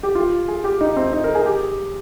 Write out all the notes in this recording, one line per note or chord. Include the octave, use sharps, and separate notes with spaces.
G4
F4
G#4
G4
D#4
C4
D#4
A#4
G#4
G4